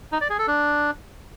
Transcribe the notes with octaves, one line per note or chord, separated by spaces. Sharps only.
D#4
D5
G#4
A4
D4